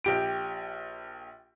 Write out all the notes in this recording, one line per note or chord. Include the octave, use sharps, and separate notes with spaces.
A#1 G4 D7